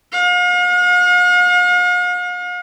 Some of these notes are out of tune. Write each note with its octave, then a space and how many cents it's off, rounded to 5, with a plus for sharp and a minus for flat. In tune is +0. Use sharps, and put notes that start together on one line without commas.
F5 +45